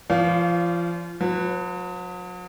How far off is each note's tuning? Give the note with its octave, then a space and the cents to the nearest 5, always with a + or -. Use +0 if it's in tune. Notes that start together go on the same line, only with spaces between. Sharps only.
F3 -30 D5 -45 F5 +0
F#3 -45 B4 +0